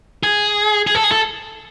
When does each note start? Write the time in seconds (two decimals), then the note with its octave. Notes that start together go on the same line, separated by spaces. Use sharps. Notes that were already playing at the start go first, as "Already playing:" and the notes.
0.23 G#4
0.87 G#4
0.95 A4
1.04 G#4
1.12 A4